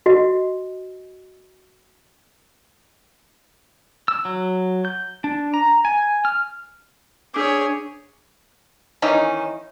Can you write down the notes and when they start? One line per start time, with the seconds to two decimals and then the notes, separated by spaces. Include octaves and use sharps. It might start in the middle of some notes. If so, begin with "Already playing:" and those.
0.06 F#4 D#5
4.08 E6
4.25 F#3
4.85 G6
5.24 D4
5.54 A#5
5.85 G#5
6.25 F6
7.34 D4 G#4 C#5 D6
9.02 D#3 E3 C#4 D#4